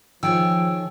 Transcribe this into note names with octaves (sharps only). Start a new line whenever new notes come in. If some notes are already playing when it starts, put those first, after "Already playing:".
D#3 F3 G#4 C#5 G5 E6